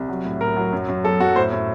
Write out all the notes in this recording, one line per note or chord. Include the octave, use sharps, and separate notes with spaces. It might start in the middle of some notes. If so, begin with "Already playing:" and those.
Already playing: C2
F#3
A2
A2 A#4
F#3
F#2
F#2
F#3 A4
F#2 F#4
A2 C5
A2